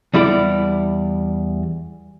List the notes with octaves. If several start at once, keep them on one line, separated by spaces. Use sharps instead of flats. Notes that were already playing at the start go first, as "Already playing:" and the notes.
E2 G3 E4 D5